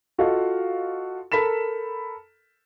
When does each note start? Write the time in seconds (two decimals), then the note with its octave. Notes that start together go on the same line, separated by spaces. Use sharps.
0.18 F4 F#4 A4 D#5 F5
1.32 A4 A#4 B5 B6 E7